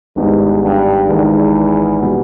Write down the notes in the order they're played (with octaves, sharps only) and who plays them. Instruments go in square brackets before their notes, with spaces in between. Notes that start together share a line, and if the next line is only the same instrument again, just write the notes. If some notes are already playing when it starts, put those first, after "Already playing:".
[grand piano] G#1 G#2 G3 B3 D#4 [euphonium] E2
[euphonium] G2
[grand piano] G#1 G#2 D#3 [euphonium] E2
[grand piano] B2 G3 B3